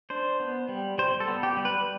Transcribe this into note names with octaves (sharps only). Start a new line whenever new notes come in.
D4 C5
B3
G3
G3 C5
A4
B3
G4
G3
B4